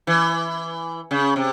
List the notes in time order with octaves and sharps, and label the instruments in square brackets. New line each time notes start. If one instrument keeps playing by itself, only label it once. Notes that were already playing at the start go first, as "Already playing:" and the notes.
[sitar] E3
C#3
C3